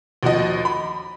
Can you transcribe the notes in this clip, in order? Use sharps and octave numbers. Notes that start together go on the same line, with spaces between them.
D#2 F3 F#4 D#5
B5